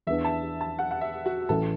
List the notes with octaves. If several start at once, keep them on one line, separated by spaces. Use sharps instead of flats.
E2 E3 B3 D4 E5
A5
A5
F#5
F#5
E5
F#4
A1 A2 E3 A4